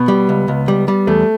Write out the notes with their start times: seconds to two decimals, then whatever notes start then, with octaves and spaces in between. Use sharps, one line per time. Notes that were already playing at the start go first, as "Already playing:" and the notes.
Already playing: B2 B3
0.08 G3
0.29 C#2
0.48 C#2
0.68 G3
0.88 G3
1.07 E2 A3